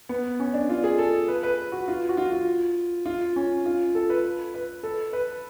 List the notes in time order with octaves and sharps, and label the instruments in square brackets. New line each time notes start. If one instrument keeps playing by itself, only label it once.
[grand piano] B3
C#4
D4
F4
G#4
A4
B4
B4
F#4
F4
F#4
F4
F4
F4
C#4
F4
A4
B4
B4
A4
B4